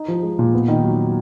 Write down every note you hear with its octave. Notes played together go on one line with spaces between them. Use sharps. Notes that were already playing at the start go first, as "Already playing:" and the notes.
Already playing: D#4
F3
G#3
A#2
B3
D#3
F#3